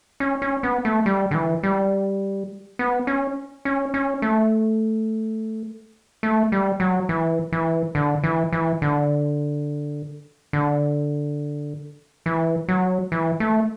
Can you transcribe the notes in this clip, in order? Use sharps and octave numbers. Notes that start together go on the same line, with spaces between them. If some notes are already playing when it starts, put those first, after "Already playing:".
C#4
C#4
B3
A3
G3
D3
E3
G3
B3
C#4
C#4
C#4
A3
A3
G3
F#3
E3
E3
D3
E3
E3
D3
D3
E3
F#3
E3
A3